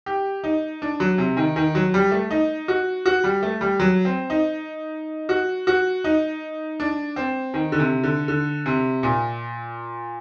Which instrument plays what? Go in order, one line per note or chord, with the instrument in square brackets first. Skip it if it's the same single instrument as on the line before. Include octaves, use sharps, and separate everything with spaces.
[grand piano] G4
D#4
D4
F#3
C3
D#3
D#3
F#3
G3
A3
D#4
F#4
F#4
G3
A3
G3
F#3
C4
D#4
F#4
F#4
D#4
D4
C4
D#3
D3
C3
D3
D3
C3
A#2